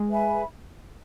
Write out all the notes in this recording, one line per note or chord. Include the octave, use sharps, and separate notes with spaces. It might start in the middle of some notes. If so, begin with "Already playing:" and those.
Already playing: G#3
B4 E5 G#5 B5